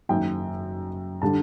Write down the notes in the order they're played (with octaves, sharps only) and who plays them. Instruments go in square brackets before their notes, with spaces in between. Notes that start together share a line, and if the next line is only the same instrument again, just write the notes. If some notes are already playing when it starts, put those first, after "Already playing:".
[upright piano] F#1 F#2 D#3 G5
D3 G3 A5